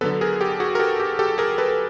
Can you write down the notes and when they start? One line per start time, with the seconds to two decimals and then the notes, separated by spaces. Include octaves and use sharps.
0.01 D3 F#3 B3 A4 B4
0.21 G#4 A#4
0.41 G4 A4
0.60 F#4 G#4
0.75 A#4
0.80 G4 A4
0.99 G4 A4
1.19 G4 A4
1.38 G#4 A#4
1.58 A4 B4